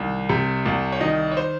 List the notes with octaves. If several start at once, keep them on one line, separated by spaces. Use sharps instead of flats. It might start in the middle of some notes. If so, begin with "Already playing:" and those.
Already playing: C2 D#3
C3
C2
C#5
D#3 D#5
C#5
C5